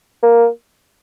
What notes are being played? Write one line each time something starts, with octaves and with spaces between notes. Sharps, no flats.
A#3